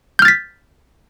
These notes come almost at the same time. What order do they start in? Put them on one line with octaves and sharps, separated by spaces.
G6 F6 A6 B6